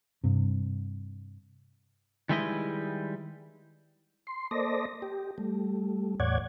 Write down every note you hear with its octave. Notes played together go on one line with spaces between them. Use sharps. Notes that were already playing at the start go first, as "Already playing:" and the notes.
G2 C3
D#3 G3 G#3 E4 B4 D#5
C6
A#3 A4 C5 D5 D#5 A#6
G4
G3 A3
E2 A2 C#5 D5 F#5 G#6